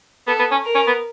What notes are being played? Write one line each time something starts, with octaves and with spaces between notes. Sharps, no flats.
B3 A4
B3
C#4
A#4
C#4
B3